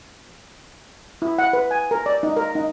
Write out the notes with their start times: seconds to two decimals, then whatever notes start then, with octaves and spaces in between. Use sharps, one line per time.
1.22 E4
1.38 F#5
1.53 B4
1.71 G#5
1.91 A#4
2.06 D5
2.23 D#4
2.37 A#4
2.55 D#4